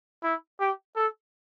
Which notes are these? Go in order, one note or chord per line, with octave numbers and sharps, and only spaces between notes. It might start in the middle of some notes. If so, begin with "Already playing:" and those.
E4
G4
A4